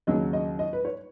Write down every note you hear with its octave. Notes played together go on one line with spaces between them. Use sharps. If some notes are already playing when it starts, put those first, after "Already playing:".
D#2 C#3 F#3 D#5
D#5
D#5
B4
C#5